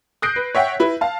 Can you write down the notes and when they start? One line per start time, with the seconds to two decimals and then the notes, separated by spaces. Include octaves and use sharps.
0.22 D#6 F#6 G6 A#6 C7 D7
0.36 B4
0.55 C#5 E5 F#5 G5
0.80 E4 B4
1.01 F5 A5